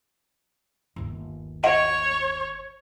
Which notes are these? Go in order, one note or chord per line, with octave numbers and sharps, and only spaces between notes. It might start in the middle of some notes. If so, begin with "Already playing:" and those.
G1 D#2
C#5 D#5 F#5 D7